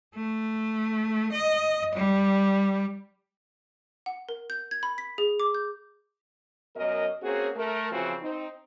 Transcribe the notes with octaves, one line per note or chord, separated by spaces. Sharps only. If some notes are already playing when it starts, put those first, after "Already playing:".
A3
D#5
G3
F#5
A#4
G6
G#6
B5
B6
G#4
D6
G6
F#2 B2 F#3 A#4 D#5
A#3 C4 C#4 F#4 G#4
A3 A#4
C#3 E3 F3 C4 F#4
C4 D#4